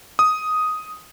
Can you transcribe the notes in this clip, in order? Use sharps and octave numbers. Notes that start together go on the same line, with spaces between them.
D#6